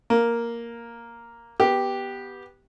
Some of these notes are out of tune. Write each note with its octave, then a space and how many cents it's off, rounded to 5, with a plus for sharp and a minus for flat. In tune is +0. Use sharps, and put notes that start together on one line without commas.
A#3 +0 F5 +0
B3 -15 G4 +0